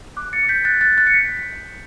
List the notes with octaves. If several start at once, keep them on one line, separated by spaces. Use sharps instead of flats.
D6 F#6
A6 C#7
G6 B6
F#6 A6
F#6 A6
F#6 A6
C#7
G6 B6